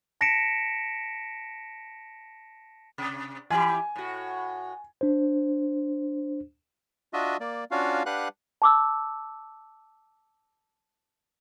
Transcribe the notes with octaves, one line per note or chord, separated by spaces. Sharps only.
A5 A#6 B6 C#7 D7 E7
C3
E3 E4 G4 G#5
A2 F#4
D4 C5
D4 F4 F#4 D#5 E5
A#3 D5
C#4 D4 F4 F#4 F5
D4 G4 B4 F5 F#5 F#6
A5 D6 E6